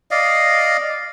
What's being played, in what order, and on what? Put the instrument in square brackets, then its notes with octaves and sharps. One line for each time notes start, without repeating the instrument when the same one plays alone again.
[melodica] D5 D#5 F5